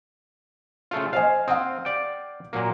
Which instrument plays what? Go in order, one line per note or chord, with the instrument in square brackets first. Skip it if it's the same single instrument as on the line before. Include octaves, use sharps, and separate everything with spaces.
[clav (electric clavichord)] C#3 A3 F4
[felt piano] C5 D#5 G#5 [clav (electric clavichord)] F5
[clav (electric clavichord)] C4 [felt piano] F5 F#5 D#6
[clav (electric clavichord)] D5 G5
A#2 F#3 A#3